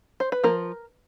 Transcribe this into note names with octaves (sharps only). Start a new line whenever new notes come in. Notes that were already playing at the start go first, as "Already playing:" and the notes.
C5
B4
F3 A#3 A#4